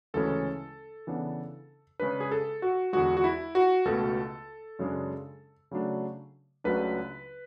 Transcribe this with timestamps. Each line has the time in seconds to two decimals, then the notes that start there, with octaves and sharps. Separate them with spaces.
0.14 D2 C#3 E3 G#3 C#4 A4
1.07 C#3 E3 B3 D4
2.00 C#3 G#3 D4 B4
2.20 G#4
2.32 A4
2.62 F#4
2.93 E2 D3 G#3 F#4
3.17 F#4
3.24 E4
3.55 F#4
3.85 C#2 B2 A3 A4
4.79 F#2 C#3 G#3 D4
5.71 C#3 F#3 A3 D4
6.64 C#2 C#3 F#3 A3 D4 B4